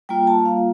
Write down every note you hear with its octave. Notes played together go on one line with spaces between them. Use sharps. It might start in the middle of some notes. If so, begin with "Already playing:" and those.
G3 A#3 F4 G5
A5
F5